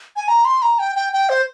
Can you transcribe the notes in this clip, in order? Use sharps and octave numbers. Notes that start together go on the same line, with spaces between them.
G#5
A#5
C6
A#5
G5
G5
G5
C5